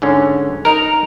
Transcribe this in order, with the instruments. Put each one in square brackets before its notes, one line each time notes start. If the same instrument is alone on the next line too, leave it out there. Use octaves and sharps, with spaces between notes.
[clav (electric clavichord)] G#2 D3 C#4
[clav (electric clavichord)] D#4 A#4 [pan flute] A#5